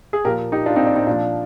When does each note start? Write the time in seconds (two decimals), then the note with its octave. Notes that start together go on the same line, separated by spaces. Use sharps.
0.13 G#4
0.24 A#2 F3 G4 A#4
0.52 D#4 G4
0.66 D4 F4
0.76 C4 D#4
0.87 D4
0.96 C4 D#4
1.07 A#2 F3 D4